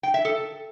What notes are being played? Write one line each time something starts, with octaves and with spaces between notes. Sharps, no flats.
G5
E5
A4